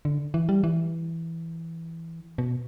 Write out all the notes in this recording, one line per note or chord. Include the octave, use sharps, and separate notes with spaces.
D3
E3
G3
E3
B2